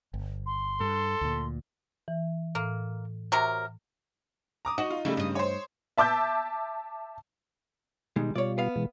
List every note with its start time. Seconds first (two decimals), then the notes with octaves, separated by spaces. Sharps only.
0.14 G1
0.46 C6
0.80 G2 A4
1.21 D2 A#2
2.08 E3
2.55 A2 A#3
3.32 C3 F#3 A#4
4.65 A#5 D6 D#6
4.78 D#4 F#4
4.90 F4
5.05 C#3 G3 A3 E4
5.17 G2 D#5
5.35 C5 C#5
5.98 E5 A5 D6 E6 G6
8.16 B2 D#3 G3 G#3 D#4
8.36 B2 G3 F4 C#5 D5
8.58 B3 F5
8.76 B2 E3 G#3